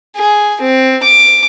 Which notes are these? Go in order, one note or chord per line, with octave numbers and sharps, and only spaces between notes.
G#4
C4
D6